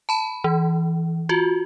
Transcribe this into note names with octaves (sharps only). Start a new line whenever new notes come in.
A5 B5
E3
F4 F#4